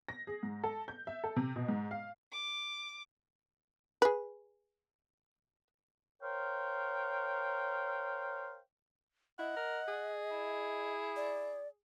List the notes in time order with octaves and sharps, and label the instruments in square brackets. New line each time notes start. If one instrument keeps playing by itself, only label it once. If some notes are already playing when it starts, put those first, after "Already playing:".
[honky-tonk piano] A#6
G#4
G#2
A4
G6
E5
A4
C3
B2
G#2
F5
[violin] D6
[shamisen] G#4 B4
[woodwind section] A#4 C5 C#5 F5 G5
[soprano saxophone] E4 [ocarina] D#5 [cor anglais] F#5
[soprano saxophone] A#4
G#4
[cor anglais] E4
[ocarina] D5